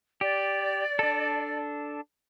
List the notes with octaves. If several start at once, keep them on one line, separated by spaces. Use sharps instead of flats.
G4 D5
D4 A4